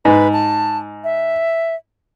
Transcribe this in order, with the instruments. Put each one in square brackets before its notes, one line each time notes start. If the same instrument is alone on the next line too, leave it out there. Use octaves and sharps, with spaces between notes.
[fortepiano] G#2 [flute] B4
[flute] A5
E5